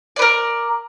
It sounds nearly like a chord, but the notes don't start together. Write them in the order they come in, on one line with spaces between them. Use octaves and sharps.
D5 B4 A#4